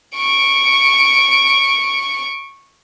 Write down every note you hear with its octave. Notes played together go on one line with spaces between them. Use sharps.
C#6 D7